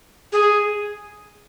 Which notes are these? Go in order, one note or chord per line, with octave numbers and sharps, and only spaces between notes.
G#4